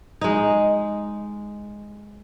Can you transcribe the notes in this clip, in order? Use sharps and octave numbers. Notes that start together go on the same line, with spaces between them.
G#3 D#4